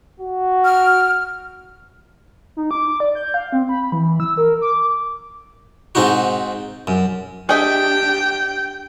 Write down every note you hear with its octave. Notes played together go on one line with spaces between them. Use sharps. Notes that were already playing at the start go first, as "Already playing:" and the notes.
F#4
F6
D#4
D6
D5
G6
F5
C4
B5
E3
E6
A#4
D6
G#2 C4 D#4 F#4
F#2
D4 G4 G#4 D#5 E5 G5